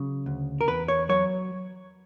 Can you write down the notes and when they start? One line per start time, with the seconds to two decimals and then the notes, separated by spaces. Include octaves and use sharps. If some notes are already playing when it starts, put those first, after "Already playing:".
Already playing: C#3 F#3
0.26 D2
0.61 A#4
0.68 E2 B4
0.88 C#5
1.09 F#3 C#5